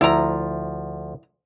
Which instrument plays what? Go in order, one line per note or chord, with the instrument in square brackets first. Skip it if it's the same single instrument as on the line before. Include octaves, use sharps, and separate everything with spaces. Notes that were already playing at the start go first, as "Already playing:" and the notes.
[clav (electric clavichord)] D2 F3 [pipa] E4 A#5